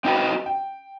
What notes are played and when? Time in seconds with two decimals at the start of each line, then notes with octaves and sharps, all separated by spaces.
0.04 C4 D#4 F#4 B4 G5
0.46 G5